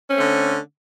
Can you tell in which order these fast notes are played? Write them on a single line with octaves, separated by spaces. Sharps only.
C#4 C4 A3 D3